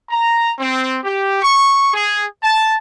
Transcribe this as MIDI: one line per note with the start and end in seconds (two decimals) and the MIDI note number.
0.10 0.52 82
0.59 0.99 60
1.04 1.39 67
1.42 1.89 85
1.94 2.24 68
2.43 2.75 81